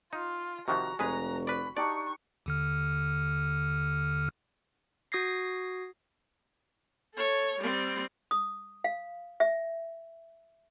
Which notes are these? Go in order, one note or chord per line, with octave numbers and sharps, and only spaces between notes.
D#4 F4
C3 D#3 F3 F#4 A#5
F1 G#3 G#4 B4 A#5
B4 D5 B5
D4 D#4 G4 D5 C#6
D#2 D3 F6
F#4 D#6 G#6 A#6 C7
A4 C#5
G3 C4
D#6
F5
E5